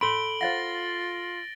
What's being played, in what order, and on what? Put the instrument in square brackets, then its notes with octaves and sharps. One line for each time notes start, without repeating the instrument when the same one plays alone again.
[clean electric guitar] A4 B5 [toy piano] C6 [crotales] D7 F#7 G7
[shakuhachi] F4 [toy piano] C5 F5 F#5 [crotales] A6 A#6